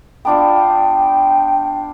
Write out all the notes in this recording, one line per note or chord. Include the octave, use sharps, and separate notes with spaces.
B3 D4 F4 G5